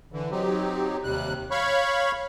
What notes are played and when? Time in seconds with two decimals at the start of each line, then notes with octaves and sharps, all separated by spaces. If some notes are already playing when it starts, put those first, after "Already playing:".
0.12 D3 E3
0.31 F#3 C4 D#4 G4
1.04 D#2 C3 G3 F#6
1.51 C#5 F5 B5 C#6